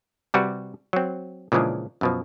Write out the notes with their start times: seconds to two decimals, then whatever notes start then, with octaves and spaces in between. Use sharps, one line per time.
0.34 C3 G3 F#4 B4 F#5
0.93 F#3 C4
1.52 A#2 C#3 E3 F3 G#3 D4
2.01 F#2 B2 F3